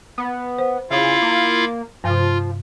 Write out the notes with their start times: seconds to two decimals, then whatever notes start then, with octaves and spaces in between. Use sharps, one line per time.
0.18 B3
0.59 C5 F#5
0.90 C#3 E4 F4 F5
1.22 A#3
2.04 G2 C3 F3 F4